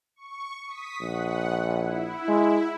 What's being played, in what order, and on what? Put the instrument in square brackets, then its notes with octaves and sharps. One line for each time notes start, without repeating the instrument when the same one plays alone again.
[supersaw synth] C#6
D#6 B6
[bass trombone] A#1 [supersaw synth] F#5
[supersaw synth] E4
[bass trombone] G#3